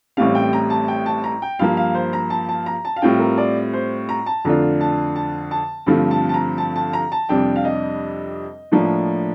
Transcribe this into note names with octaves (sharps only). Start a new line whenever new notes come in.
A1 A2 G3 C4 F5
G5
A#5
A5
G5
A5
A#5
G5
G2 F3 A#3 F5
F5
C5
A#5
A5
A5
A#5
A5
F5
A2 G3 C4 F4 G5
A#4
D5
C5
A#5
A5
F2 D3 A3 D4 F4 A#5
A5
A5
A5
G2 D3 F3 A3 C4
A5
A5
A#5
A5
A5
A#5
A5
F2 C3 G3 D4 G5
F5
D#5
A2 F3 A#3 D4